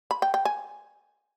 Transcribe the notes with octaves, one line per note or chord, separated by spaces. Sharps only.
B5
G5
G5
G#5